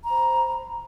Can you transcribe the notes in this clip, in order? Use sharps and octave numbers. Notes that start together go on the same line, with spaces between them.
C5 A#5 B5